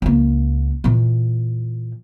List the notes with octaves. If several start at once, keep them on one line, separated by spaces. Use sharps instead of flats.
C#2 A#3
A#2 E3